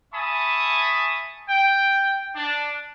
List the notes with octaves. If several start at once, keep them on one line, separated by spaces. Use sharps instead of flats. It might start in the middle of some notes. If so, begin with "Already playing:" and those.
E5 G#5 A5 B5 C#6 D#6
G5
D4